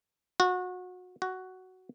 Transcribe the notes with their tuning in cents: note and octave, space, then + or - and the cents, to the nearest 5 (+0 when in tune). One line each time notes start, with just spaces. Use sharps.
F#4 -25
F#4 +10